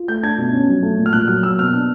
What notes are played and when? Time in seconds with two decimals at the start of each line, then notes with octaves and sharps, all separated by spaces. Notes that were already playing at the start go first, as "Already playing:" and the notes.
Already playing: F4
0.08 A3 G6
0.23 D4 G#6
0.38 B2
0.53 C#4
0.68 F#3
0.83 A3
0.98 A#2
1.06 F6
1.13 A#2 F#6
1.28 F#3 F6
1.43 A#3 E6
1.59 B2 F6
1.74 D4